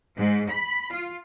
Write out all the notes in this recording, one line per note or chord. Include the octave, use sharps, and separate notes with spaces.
G#2
B5
F4